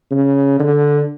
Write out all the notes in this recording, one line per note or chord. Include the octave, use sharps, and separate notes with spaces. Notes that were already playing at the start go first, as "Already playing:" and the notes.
C#3
D3